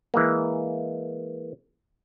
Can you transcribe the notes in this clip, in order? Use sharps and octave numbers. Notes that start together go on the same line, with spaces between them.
E3 G#3 A#3